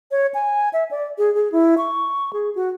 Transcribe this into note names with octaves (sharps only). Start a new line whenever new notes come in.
C#5
G#5
E5
D5
G#4
G#4
E4
C#6
G#4
F#4